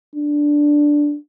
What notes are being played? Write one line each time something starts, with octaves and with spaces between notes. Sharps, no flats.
D4